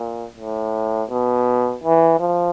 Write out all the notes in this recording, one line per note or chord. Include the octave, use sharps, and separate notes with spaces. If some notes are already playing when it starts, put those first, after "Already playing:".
Already playing: A#2
A2
B2
E3
F3